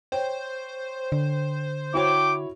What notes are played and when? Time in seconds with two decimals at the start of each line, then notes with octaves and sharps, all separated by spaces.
0.12 C5 C#5 G5
1.12 D3
1.94 E4 F#4 C#5 G5 D6